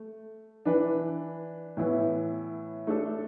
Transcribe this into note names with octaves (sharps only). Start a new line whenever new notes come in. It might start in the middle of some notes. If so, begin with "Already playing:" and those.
Already playing: A3
E3 D4 B4
A2 E3 B3 E4
A3 D4 A4